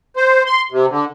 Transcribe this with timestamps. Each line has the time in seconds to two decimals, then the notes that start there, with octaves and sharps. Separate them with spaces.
0.16 C5
0.46 C6
0.72 C3
0.90 D3